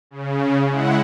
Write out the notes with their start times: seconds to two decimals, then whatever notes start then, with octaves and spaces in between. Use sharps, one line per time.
0.11 C#3
0.69 G#3 E4 F#5